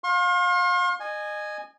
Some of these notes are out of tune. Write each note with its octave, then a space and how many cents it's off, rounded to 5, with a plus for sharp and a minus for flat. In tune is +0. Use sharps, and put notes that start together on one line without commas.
F5 +30 C6 +45
D#5 -30 G#5 +0